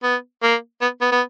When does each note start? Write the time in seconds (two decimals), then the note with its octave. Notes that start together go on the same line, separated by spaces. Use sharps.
0.03 B3
0.43 A#3
0.81 B3
1.01 B3
1.12 B3